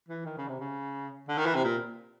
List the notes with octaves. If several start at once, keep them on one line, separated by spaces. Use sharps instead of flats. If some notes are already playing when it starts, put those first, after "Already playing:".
E3
D#3
C#3
C3
C#3
D3
D#3
E3
C3
A#2